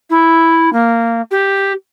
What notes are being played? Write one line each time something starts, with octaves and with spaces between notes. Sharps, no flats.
E4
A#3
G4